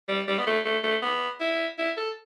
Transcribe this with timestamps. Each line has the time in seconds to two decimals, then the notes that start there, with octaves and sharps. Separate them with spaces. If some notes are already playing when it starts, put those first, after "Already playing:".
0.08 G3
0.28 G3
0.38 B3
0.46 A3
0.65 A3
0.83 A3
1.02 B3
1.40 E4
1.78 E4
1.97 A4